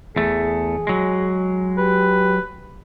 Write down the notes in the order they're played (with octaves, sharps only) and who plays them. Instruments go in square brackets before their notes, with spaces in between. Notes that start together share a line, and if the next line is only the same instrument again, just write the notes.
[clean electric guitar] E2 A3 [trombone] G#4
[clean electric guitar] F#3 G#3
[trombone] G4 [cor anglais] B4